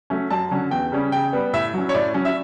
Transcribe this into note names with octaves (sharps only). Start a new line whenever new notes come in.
F#3 A3 C#4
F#2 A5
D3 F#3 C#4
E2 G5
C#3 G3 C#4
C#3 G5
G3 B3
A2 E5
F#3 C#4
C#5
A2 D5
F#3 C#4
E5